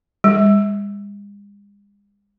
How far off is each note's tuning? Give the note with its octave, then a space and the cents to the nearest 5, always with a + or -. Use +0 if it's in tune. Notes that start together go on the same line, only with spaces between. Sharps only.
G#3 -45